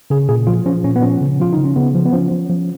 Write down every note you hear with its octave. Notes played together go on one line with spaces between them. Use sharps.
C#3 G#4
A#2 G#4
F3 F4
F3 C#4
A#2 C#4
B3
F3 C#4
C#3
F3 F4
C#3 D#4
C#4
C#3 B3
F3
B3
F3 C#4
F3
F3